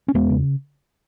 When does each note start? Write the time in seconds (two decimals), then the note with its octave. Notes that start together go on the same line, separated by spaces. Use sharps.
0.08 C#4
0.14 E2 G#3 B3
0.30 C#3